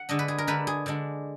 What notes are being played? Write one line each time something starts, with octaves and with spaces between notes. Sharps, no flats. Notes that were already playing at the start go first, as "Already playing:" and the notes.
Already playing: F#5
D3 G#3 D4 D#5
B4
G#4
A#4
D3 G#3 D4 B4
G#4
D3 G#3 D4